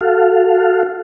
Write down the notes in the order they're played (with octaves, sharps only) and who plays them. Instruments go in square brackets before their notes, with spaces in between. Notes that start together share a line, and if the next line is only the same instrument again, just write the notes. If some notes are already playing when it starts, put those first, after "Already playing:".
[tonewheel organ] F#4 A4 F5